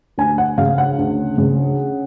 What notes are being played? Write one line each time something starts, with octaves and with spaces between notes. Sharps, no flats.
D2 G#5
F#5
C#3 F5
F#5
D2
C#3